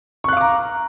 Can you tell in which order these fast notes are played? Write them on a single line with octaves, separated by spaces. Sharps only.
C#6 F#6 F5 D6 A#5